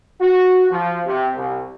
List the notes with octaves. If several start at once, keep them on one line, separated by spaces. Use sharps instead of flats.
F#4
F3
C3
C2